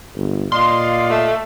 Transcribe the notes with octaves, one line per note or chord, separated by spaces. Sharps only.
G1
A#2 D5 D#5 F5 C6
A3